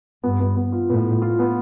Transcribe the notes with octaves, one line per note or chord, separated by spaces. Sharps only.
G2 B3
B3
B3
F4
A2 B3
F4
F4
B3